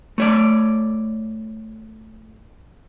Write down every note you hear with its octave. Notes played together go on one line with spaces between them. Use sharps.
A3 C#5 D5